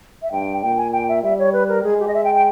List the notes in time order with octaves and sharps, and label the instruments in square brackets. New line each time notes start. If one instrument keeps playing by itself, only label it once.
[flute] E5
[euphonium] G2 [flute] G5
[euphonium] A#2 [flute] G5
[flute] G#5
G5
E5
[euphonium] G3 [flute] E5
[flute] C#5
B4
A#4
[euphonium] G#3 [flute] G#4
[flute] G4
D#5
E5
G5
G5